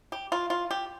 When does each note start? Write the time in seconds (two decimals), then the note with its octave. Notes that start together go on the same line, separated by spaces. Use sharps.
0.12 G4
0.32 F4
0.50 F4
0.71 G4